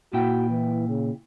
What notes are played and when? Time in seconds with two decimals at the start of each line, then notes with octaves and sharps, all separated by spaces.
0.13 A#2 E4 F#4 G5
0.50 E3
0.88 C#3